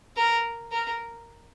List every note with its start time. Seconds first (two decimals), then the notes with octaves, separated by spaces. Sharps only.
0.17 A#4
0.72 A#4